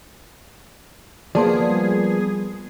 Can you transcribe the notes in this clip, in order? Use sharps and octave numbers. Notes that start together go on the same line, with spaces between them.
F3 A#3 B3 G#4 D5 A5 C6
G3